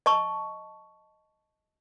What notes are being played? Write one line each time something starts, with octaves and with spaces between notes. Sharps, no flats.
D#5 A5 C#6